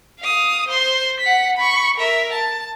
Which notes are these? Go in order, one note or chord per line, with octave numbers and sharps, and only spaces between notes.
F5 D#6
C5 C6
F#5 B6
B5 C#6
A#4 E5
A5